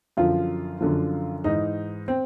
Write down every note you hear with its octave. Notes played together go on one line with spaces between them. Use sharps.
F#2 D3 F3 F4
F#2 D3 F3
G#2 E3 D#4
C4